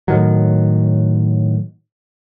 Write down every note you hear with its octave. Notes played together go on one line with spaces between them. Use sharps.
A2 D#3 F#3